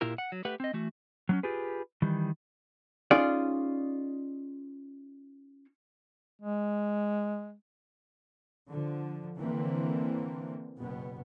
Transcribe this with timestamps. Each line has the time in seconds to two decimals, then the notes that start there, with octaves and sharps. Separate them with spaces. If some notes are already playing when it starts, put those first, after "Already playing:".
0.01 A#2 E4 F4 G4 A#4
0.18 F#5
0.32 F#3
0.45 A3 G4 B4 F#5
0.60 C4 D#5
0.73 E3 A3 F#4
1.29 F#3 B3 C#4
1.43 F4 G4 G#4 B4
2.02 D#3 E3 G3
3.11 C#4 D#4 F4 G#4 D5
6.41 G#3
8.70 D3 F3
9.38 D3 E3 A#3 C4
10.77 F#1 B2 B3